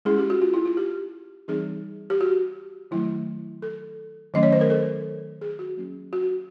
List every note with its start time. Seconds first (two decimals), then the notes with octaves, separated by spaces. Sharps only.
0.05 G#3 C#4 E4 G#4
0.18 G4
0.30 F#4
0.41 F4
0.54 E4
0.65 F4
0.77 G4
1.48 E3 G3 C4 D#4 G#4
2.10 G4
2.21 F#4
2.91 D#3 F#3 A3 E4
3.62 A4
4.34 D#3 F#3 A3 C#4 D#5
4.43 C#5
4.52 C5
4.61 A#4
4.70 A4
5.41 G#4
5.59 F#4
5.77 F#3 A#3 C#4
6.13 F#4